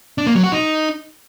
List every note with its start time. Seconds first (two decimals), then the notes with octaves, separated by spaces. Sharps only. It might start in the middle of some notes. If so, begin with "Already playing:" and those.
0.18 D4
0.26 A#3
0.35 F#3
0.44 F#4
0.52 D#4